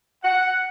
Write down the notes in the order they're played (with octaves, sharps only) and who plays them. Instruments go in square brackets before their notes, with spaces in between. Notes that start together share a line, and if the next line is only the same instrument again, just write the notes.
[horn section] F#5